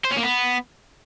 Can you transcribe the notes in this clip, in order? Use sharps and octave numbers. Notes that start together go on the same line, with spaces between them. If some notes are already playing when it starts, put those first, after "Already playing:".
C5
C#4
A#3
B3